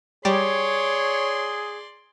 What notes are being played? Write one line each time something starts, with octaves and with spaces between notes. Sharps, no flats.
G3 G#4 C#5 D5 C6